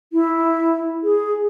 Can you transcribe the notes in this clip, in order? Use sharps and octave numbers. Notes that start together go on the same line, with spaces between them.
E4
G#4